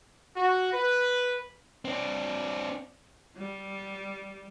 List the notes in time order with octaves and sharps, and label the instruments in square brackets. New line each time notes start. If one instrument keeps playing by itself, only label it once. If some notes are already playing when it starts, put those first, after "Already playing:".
[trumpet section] F#4
B4
[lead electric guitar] C4 D4
[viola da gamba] G3